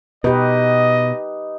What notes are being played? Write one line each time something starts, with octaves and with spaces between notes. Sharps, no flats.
B2 D#4 G4 B4 D#5